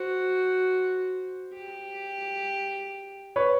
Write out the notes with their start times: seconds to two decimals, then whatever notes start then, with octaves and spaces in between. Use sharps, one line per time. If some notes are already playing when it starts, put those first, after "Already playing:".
Already playing: F#4 C5
1.53 G4
3.36 B4 C#5